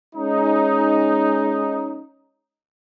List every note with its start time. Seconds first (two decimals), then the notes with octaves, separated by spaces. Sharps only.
0.15 G#3 C#4 D#4